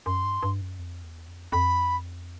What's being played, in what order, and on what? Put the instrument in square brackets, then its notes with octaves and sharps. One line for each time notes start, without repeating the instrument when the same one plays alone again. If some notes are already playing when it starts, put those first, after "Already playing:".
[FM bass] F#2 [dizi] C6
[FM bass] G2
G2
F#2
F2
E2
F2
[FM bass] F2 [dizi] B5